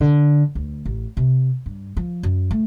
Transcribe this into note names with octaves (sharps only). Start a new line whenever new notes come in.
D3
D2
A1
C3
G2
F3
F#2
A3